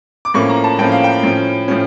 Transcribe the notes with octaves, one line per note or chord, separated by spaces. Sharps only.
D6
A2 F3 A#3 C#4 C#6
A#5
A5
A2 F3 A#3 C#4 G5
F5
G5
A2 F3 C#4
A2 F3 C#4